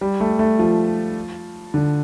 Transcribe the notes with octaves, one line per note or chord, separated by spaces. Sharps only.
G3
A3
A3
F3
D3